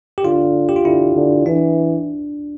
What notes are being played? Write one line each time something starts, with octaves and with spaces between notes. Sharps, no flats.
G4
D3 F4
G4
F4
D3 E4
D3
E3 D4